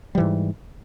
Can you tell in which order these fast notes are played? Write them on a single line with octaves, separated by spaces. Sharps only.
G3 E3 G#2